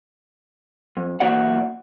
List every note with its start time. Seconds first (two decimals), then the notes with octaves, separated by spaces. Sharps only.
0.97 F2
1.20 B1 E3 A#3 F#4 D5 F#5